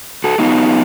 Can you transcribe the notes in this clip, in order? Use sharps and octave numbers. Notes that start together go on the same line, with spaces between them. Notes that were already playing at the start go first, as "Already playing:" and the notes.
F#4 A4
B3 D#4 F4 G4